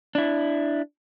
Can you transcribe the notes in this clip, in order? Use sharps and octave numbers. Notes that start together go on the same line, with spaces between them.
D4 E4